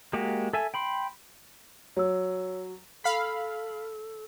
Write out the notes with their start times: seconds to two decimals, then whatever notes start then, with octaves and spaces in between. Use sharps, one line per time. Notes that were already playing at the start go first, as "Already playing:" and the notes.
0.13 G#3 A#3 F#4 G4
0.53 A4 E5 G#5
0.74 G5 B5 C6
1.97 F#3 C#5 E6
3.04 A4 F5 B5